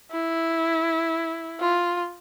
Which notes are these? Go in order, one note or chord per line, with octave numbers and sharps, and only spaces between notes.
E4
F4